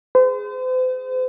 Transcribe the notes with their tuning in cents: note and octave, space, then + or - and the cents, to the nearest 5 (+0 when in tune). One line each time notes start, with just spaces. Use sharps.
G#4 +0 C5 -40